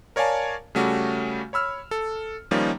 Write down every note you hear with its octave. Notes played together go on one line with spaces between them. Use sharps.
A#4 C#5 D5 F5 G#5 A5
C#3 G3 A3 C#4 F#4 G4
C#5 B5 E6 F6
A4
D#3 F3 G3 A#3 C#4 D#4